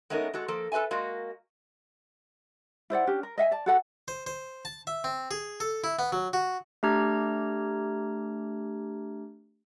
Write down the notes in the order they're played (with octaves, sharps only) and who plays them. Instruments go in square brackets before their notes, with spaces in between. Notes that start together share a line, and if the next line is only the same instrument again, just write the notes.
[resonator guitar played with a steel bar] G#3 A3 B3 C#4 D#4 A#4
G#3 F#4 A4
F3 A#3 A4
A4 B4 D#5 E5 G#5
G#3 A#3 F#4
[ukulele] E4 C5 D5 F#5
C#4 D4 G4
A#4
D#5 E5 F#5 G#5
D5 A5
F#4 A4 F#5
[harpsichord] C5
C5
A5
E5
C4
G#4
A4
E4
B3
F#3
F#4
[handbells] A3 D4 G4 A#5 F6 G#6